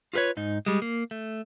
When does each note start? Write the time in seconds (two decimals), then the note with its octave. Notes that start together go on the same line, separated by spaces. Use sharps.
0.13 F4 G4 A#4 B4 C#5
0.37 G#2 D#4
0.66 G3 G#3
0.82 A#3
1.11 A3